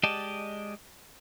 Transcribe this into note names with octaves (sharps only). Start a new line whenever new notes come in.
G#3 G4 D5 D#5 A5